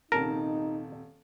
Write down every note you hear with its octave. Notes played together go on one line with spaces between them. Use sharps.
D#1 C3 D#4 A#4 A5